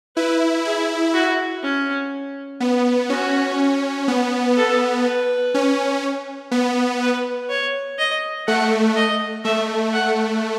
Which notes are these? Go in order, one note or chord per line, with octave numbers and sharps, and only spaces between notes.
E4 B4
E4 G#4
F#4
C#4
B3
C#4 F#4
B3
A4
B4
C#4
B3
B4
C#5
D#5
A3 F#5
D#5
A3 E5
F#5